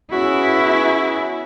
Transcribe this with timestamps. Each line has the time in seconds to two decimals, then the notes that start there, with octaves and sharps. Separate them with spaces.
0.12 B3 C#4 E4 F#4 G#4